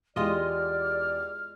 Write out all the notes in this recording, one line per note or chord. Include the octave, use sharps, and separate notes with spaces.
E2 G#3 F4 G4 D5 D#5 F6